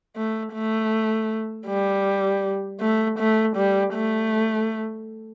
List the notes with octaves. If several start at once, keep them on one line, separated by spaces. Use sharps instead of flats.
A3
A3
G3
A3
A3
G3
A3